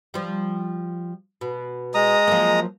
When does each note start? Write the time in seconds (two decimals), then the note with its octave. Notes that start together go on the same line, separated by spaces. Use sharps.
0.14 F3 G3
1.41 B2
1.94 G#3 A#5 D#6
2.27 F3 F#3 A#3